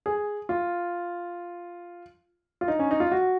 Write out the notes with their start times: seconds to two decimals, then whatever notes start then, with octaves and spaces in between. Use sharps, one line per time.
0.06 G#4
0.49 F4
2.61 F4
2.68 D#4
2.79 C#4
2.91 D#4
3.00 F4
3.12 F#4